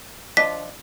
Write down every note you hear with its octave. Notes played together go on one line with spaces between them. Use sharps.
F3 D4 D#5 B6